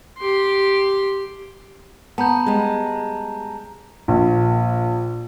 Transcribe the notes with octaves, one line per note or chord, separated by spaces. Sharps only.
G4 C6
B3 A5 A#5 G6
G3 G#3
A#1